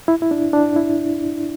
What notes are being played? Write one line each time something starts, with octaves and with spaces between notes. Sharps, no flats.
E4
E4
D4
D4
E4